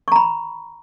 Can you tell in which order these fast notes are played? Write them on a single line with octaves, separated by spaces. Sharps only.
C#6 A#5 B5